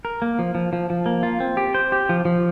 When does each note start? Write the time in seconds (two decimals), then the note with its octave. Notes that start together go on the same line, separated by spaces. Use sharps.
0.05 A#4
0.22 A#3
0.39 F3
0.55 F3
0.73 F3
0.90 F3
1.06 A#3
1.23 F4
1.40 C4
1.57 G4
1.74 C5
1.92 G4
2.09 F3
2.25 F3